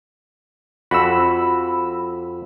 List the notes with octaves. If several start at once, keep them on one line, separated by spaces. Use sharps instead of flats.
F2 F#4 B5 E6